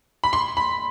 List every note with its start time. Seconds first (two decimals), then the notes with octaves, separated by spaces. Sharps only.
0.24 B5
0.33 C6
0.57 B5